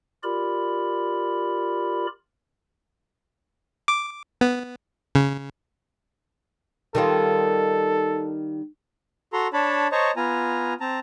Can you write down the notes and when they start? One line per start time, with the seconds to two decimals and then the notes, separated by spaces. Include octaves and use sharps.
0.23 F4 G4 A#4 D5 B5
3.88 D6
4.41 B3
5.15 C#3
6.95 D#3 G3 F4 A4
9.33 F#4 A4 A#5 C6
9.53 D4 C#5 A5 B5
9.92 C5 C#5 D#5 A5 A#5 C#6
10.16 B3 F4 G#5 A#5
10.81 C4 A5 A#5